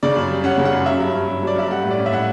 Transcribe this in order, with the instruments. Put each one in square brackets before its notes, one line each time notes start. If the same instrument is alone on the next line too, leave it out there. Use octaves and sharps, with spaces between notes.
[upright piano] C#3 D5
F#2
G3
C#4 F#5
C#3
F#5
F#2
F#3 E5
G2
C#4
G2
F#3 D5
G2 E5
G3 F#5
A2
D5
C#4
E5
A2 F#5